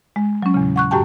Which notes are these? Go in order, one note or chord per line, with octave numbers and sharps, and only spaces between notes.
G#3
F#3 C#4
E2 A#2 C#3
F#5 C#6 F#6
F#2 A2 F#4 G4 G5 A5